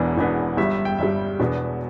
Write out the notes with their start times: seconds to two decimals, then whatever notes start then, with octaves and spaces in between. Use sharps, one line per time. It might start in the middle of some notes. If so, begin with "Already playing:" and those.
Already playing: E1 E2 E3 B3 D4
0.17 E1 E2 E3 B3 D4
0.57 G1 G2 G3 E5
0.71 E5
0.85 G5
0.98 G1 G2 G3 E5
1.39 E1 E2 B2 B3 D4